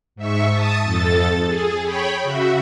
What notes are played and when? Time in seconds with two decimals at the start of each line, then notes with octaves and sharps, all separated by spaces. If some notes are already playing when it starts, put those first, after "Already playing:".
0.16 G#2 E5 C#6
0.51 A5 D#6 A6
0.84 F2 A4 A6
1.45 G#4
1.83 C#5 G5 B5
2.23 C#3 F#4 E5